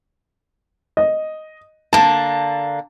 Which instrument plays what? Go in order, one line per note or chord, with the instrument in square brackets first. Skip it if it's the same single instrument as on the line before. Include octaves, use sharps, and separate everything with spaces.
[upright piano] D#5
[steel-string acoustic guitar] D3 A#3 [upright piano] A5